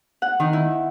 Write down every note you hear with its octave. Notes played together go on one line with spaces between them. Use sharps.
F#5
D#3
E4